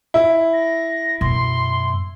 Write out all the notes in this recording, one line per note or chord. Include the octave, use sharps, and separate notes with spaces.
E4
A#6
F#2 B2 C6